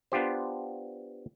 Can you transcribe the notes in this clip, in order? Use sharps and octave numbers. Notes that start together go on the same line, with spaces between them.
B3 D4 F4 G4 C5